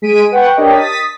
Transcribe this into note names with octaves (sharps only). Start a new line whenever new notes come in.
G#3 B6 D7 D#7
B4 F#5 G5 C#6
D4 G4 A#4 C#5 D#5
D#6 A6 B6